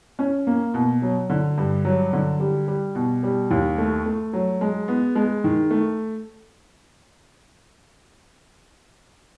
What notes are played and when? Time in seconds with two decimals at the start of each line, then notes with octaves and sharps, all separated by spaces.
0.19 C#4
0.47 A#3
0.74 B2
1.02 F#3
1.30 D3
1.58 G2
1.85 F#3
2.13 D3
2.40 G3
2.68 G3
2.95 B2
3.23 G3
3.51 D#2
3.78 A3
4.06 A3
4.33 F#3
4.61 G#3
4.88 B3
5.15 G#3
5.44 D#3
5.71 A3